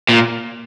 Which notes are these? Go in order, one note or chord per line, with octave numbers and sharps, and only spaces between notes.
A#2